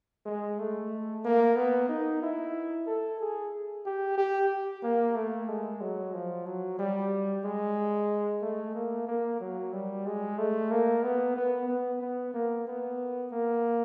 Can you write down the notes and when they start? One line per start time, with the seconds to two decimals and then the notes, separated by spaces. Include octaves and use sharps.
0.26 G#3
0.59 A3
1.24 A#3
1.56 B3
1.89 D#4
2.22 E4
2.87 A4
3.20 G#4
3.86 G4
4.17 G4
4.83 A#3
5.16 A3
5.48 G#3
5.81 F#3
6.13 F3
6.46 F#3
6.79 G3
7.44 G#3
8.42 A3
8.74 A#3
9.07 A#3
9.40 F#3
9.73 G3
10.06 G#3
10.38 A3
10.71 A#3
11.03 B3
11.36 B3
11.68 B3
12.01 B3
12.34 A#3
12.67 B3
13.31 A#3